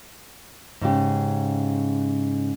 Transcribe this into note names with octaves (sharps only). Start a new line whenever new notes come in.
G#2 C#3 G4